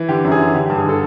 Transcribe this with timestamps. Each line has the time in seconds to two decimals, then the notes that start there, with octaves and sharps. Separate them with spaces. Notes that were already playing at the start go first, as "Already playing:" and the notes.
Already playing: E3
0.08 D3 G4
0.24 F#2
0.32 G#4
0.39 D3
0.55 D3 G4
0.66 G4
0.70 G2
0.77 G#4
0.85 D3 A4